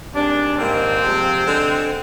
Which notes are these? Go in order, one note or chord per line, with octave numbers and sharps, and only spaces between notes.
C3 D#3 G#3 D4
G#2 D#3 G3 A#3 C4
C3 F3 G#3
D3 G#3